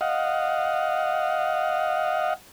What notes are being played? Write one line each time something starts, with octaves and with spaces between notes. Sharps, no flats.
D#5 F5 F#5